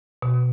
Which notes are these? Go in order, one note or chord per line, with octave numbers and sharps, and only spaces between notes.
B2